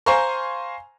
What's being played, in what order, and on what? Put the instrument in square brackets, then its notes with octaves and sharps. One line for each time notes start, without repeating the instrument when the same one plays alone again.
[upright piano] C5 F5 G#5 A#5 C6 C#6